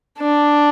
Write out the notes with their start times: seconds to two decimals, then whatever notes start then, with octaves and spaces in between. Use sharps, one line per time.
0.18 D4